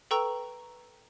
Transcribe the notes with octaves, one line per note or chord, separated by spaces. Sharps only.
A4 B4 G5 A#5 C#6 E6